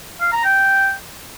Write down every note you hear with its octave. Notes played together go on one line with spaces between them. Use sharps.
F5
A#5
G5